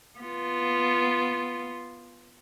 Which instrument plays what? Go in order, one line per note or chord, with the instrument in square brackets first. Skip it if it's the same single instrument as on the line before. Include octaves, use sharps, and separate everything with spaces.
[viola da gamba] B3 F4